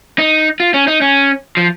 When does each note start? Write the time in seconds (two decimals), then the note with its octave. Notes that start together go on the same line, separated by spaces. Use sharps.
0.18 D#4
0.60 F4
0.74 C#4
0.88 D#4
1.02 C#4
1.57 F3